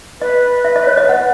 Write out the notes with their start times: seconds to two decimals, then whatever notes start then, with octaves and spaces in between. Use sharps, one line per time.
0.21 B4 D#5
0.65 E5
0.76 D#5
0.87 C#5
0.97 D#5
1.09 F#5